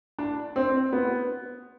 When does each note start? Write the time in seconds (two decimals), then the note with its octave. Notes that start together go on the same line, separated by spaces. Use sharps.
0.19 D4
0.56 C4
0.93 B3